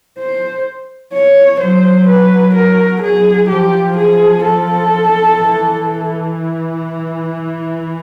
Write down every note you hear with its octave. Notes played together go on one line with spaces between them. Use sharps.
C5
C#5
F#3 C5
B4
A#4
G#4
F3 G4
G#4
A4
E3